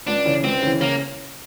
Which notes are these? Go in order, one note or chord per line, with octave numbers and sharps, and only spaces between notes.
C#2 D4
C#3 E3
C#2 C4
C#3 E3
C#3 A#3